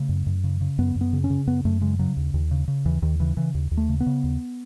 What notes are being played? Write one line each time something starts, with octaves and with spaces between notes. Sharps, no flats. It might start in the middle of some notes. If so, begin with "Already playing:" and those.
Already playing: C#3 A3
F#2
F#2
C#3
C#3
F#2 B3
F#2
B3
C#3
C#4
C#3
F#2 B3
F#2 A3
C#3 G#3
C#3 F#3
D#2
D#2
C#3
C#3
D#2 E3
D#2 D#3
C#3 E3
C#3 E3
D#2
D#2
A3
C#3
B3
C#3
D#2